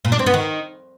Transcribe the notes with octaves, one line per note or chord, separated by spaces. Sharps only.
A#2
D4
C4
B3
D#3